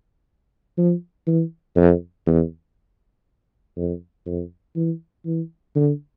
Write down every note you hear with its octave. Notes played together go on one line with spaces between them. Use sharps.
F3
E3
F2
E2
F2
F2
E3
E3
D3